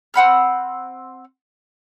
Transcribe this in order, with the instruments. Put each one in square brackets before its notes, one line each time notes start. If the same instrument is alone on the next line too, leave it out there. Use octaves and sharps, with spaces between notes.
[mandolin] C4 F#5 B5 F6